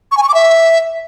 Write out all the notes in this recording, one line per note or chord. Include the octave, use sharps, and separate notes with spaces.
C#6
G#5
C#6
D6
E5